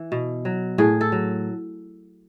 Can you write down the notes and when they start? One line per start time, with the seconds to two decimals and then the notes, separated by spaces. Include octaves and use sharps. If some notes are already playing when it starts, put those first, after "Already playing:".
Already playing: E3
0.12 B2
0.45 F#3
0.78 A2 G#4
1.01 A4
1.12 F#3